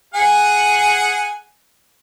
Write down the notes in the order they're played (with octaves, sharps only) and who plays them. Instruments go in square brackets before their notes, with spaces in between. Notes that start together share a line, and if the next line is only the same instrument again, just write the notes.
[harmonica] G#4 F#5 G#5